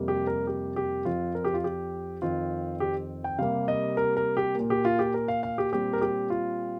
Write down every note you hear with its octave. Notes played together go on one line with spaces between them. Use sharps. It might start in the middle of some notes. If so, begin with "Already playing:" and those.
Already playing: F2 C3 G3 A#3
G4
A#4
G4
G4
F2 F3 C4 F4
A#4
G4
F4
G4
F2 D#3 C4 F4
G4
G5
C3 G3 A#3 F5
D#5
A#4
A#4
G4
A#2 A#3
G4
F4
G4
A#4
F5
F5
G4
A#2 G3 C4 G4
A#4
G4
F4